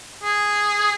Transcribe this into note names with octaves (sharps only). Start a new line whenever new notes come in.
G#4